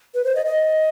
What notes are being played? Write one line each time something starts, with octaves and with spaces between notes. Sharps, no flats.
B4
C5
D#5
D#5